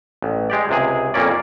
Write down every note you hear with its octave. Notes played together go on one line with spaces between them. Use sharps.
A1
G#3 G4 D5
C#2 C3 G#4
F2 A#2 A#3 C#4 D5